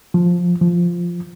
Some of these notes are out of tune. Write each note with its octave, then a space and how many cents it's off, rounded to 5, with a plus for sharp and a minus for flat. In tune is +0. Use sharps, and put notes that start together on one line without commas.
F3 +10
F3 -5